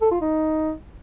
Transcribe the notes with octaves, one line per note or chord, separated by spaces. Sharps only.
A4
F4
D#4